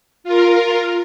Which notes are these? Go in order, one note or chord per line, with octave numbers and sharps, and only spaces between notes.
F4 A#4